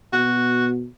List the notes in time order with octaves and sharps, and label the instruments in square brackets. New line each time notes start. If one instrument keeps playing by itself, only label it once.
[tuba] B2 [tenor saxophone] F#4